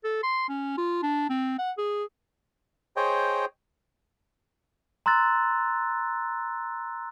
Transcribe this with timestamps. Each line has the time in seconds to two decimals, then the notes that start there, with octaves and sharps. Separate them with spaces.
0.04 A4
0.23 C6
0.49 C#4
0.78 F4
1.03 D4
1.30 C4
1.59 F#5
1.78 G#4
2.96 G#4 C5 C#5 D#5 G5
5.06 A#5 C6 E6 F#6 A6